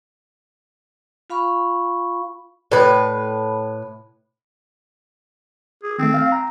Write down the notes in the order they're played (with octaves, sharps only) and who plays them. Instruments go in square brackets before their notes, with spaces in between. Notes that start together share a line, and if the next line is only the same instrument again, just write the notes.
[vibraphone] F4 F5 B5 C#6
[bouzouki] A2 B4
[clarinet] G#4
[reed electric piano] D#3 A3 [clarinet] C4
[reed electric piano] F5
A#5